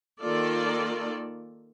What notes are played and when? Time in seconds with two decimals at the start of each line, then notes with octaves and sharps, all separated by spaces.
0.21 D#3 A#3 F4 A4 D5